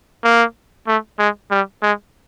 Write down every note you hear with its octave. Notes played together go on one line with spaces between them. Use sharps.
A#3
A3
G#3
G3
G#3